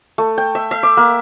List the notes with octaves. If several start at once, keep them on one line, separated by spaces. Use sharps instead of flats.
A3
G5
E5
E5
D6
A#3